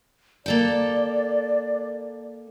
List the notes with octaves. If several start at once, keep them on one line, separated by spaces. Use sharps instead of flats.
A#3 A4 D5 G5